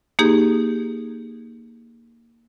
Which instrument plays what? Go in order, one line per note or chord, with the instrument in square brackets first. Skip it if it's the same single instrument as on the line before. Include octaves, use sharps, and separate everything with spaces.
[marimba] A#3 D#4 G4 G#4